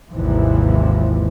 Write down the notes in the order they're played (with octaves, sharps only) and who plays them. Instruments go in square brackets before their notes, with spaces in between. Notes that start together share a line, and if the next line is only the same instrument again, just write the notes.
[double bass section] G#1 D#2 C3 E3 F3